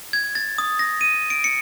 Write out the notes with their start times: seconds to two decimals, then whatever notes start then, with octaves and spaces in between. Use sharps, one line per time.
0.13 G#6
0.35 A6
0.58 D#6
0.79 A#6
1.01 D#7
1.30 D7
1.44 C#7